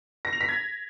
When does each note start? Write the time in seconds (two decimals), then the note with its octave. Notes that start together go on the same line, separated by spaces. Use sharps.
0.25 A#6
0.33 F7
0.41 B6
0.49 G#6